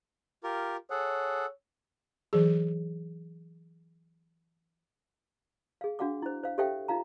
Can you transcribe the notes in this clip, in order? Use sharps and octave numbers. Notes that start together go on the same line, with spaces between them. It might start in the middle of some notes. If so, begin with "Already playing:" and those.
F4 G4 A#4
G#4 A4 C#5 F#5
E3 F#3 G#4
G#4 F5
D4 F#4 F5 F#5 D6
E4 C5
C5 F5
G4 A4 C5 E5 F5 G5
D#4 F4 F5 A#5